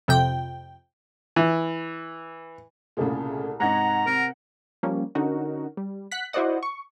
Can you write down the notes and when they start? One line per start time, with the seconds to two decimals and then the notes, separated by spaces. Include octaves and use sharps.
0.08 F2 C3 G5
1.36 E3
2.97 C2 A#2 C#3 A3 G#4
3.60 G#2 C3 D#4 F#5 A#5 G#6 A#6
4.06 C3 A#4
4.83 F3 G3 A#3 C#4
5.15 D3 C#4 D#4 F#4 A#4
5.77 G3
6.11 F#5 F#6 B6
6.33 E4 F#4 C5 D5 D#5 F#5
6.63 C#6